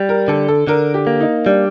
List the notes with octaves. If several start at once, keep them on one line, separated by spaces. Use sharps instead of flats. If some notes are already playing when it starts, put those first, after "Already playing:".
Already playing: G3
A#4
D3 A4
A4
D3 A#4
G4
A#3
D#4
G3 D4